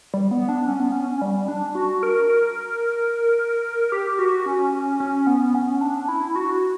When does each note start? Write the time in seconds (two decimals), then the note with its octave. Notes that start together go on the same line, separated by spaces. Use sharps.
0.14 G3
0.31 B3
0.49 D4
0.67 C#4
0.80 B3
0.92 C#4
1.22 G3
1.48 D4
1.75 F#4
2.03 A#4
2.29 A#4
3.92 G4
4.19 F#4
4.46 C#4
5.00 C#4
5.27 B3
5.55 C#4
5.81 D4
6.08 E4
6.36 F#4